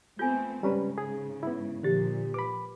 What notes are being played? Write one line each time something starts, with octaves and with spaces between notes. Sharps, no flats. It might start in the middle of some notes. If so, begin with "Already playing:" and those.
A3 B3 C4 F4 A4 G#5 G6
G#2 C#3 G3 C#4 B4 A#5
G#4
B3 E4
A#2 D3 F3 G4 C5 A6
B4 B5 D6